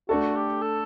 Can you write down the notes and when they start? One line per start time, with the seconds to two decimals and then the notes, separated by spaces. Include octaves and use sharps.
0.09 A3 D4 F#4 A4
0.35 G4
0.62 A4